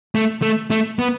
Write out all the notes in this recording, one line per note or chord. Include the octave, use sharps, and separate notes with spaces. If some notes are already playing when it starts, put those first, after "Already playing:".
A3
A3
A3
B3